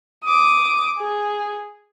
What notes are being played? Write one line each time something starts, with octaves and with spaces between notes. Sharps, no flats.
D6 D#6
G#4